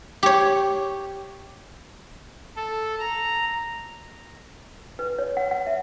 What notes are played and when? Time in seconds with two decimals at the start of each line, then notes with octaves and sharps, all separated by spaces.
0.23 G4 C#5
2.56 A4
3.00 A#5
4.99 B4
5.19 C#5
5.37 F#5
5.51 F#5
5.66 E5